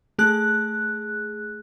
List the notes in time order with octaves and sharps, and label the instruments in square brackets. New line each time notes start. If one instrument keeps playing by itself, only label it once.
[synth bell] A3 G#4 F#6